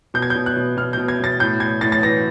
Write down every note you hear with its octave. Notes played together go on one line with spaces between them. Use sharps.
B2 G6
G#6
G6
B2
F#6
B2
B2 F6
B2 G6
G#6
B2 A6
A2 G6
A2 G#6
A2 A6
A6
E3 A#6